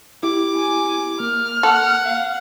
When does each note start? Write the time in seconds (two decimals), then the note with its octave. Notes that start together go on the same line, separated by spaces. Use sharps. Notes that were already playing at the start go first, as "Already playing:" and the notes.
0.23 E4 G4 D6
0.57 G#5
1.20 A#3 F6
1.63 A4 F#5
2.05 F5